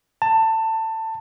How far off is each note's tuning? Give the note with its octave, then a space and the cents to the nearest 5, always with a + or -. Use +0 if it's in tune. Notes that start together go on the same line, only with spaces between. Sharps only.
A5 +20